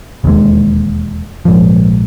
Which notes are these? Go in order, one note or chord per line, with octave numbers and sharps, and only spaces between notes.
E1 D#2 D#3 G#3
A#1 G#2 F3